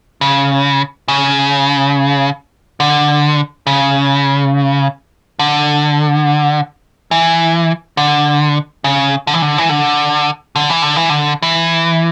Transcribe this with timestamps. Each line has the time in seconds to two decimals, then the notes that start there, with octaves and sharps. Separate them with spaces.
0.21 C#3
1.08 C#3
2.80 D3
3.67 C#3
5.39 D3
7.11 E3
7.97 D3
8.84 C#3
9.27 D3
9.34 E3
9.42 D3
9.58 E3
9.69 D3
10.56 D3
10.70 E3
10.82 D3
10.96 E3
11.09 D3
11.42 E3